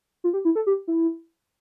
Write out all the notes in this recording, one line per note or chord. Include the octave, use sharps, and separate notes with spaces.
F4
G4
E4
A4
G4
E4